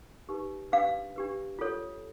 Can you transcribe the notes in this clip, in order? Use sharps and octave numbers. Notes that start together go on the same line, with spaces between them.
D#4 G4 B4
D4 G4 B4 F5
D4 G4 B4
F4 A4 C#5